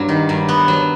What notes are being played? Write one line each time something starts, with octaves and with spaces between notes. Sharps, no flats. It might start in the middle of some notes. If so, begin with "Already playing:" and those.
Already playing: G2 F#3
D#3
G2
B3
F#3